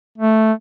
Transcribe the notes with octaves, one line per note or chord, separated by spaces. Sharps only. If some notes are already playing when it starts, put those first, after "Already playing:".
A3